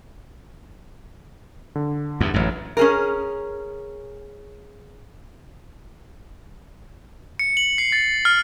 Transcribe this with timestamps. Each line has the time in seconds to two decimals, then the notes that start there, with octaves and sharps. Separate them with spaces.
1.75 D3
2.20 E2 G2
2.34 A1 F#2
2.77 C#4 G#4 A#4
7.39 C#7
7.57 F#7
7.78 C7
7.92 A6
8.25 F6